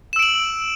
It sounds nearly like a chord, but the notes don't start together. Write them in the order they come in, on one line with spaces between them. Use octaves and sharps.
E7 E6 D7 F#7